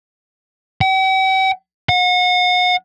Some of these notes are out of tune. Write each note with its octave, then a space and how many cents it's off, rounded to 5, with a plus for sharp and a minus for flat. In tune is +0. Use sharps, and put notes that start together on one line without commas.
G5 -45
F#5 -35